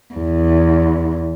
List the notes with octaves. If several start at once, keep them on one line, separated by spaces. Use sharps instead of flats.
E2